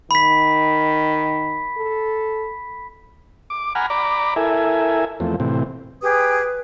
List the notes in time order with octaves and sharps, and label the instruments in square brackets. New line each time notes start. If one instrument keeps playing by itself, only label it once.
[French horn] D#3 [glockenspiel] B5 B6
[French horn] A4
[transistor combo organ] D6
F#5 G#5 A#5 B5 F6
D5 A#5 B5 D6
E4 A4 A#4 E5 G#5
E2 F3 A3 C4
A2 C3 E3 C4
[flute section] G4 G#4 D#6 [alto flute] B4